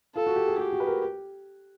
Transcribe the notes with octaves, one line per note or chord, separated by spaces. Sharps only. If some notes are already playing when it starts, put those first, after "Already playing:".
F4 A4
F#4
G4
G#4
F#4 G4
F#4
B4
A#4